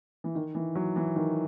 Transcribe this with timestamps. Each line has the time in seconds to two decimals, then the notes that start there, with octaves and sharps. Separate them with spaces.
0.24 E3
0.35 D#3
0.55 E3
0.75 F#3
0.96 E3
1.16 D#3